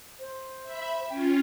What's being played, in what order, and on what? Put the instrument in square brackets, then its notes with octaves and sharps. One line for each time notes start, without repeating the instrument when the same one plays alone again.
[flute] C5
[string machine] E5 B5
[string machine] C#4 F4 [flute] G5